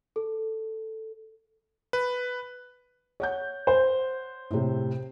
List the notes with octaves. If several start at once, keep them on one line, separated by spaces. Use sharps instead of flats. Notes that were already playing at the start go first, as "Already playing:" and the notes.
A4
B4
C#5 F#5 G6
C5
A2 C3